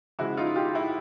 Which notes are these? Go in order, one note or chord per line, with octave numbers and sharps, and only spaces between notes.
C#3 F3 G#3 E4 F#4
D#4 F4
F4 G4
E4 F#4